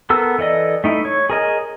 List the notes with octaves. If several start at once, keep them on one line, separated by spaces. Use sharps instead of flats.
B3 A4 A#4 E6
E3 A4 D5 D#5
A3 D#4 E4
C#5
G#4 A#4 D#5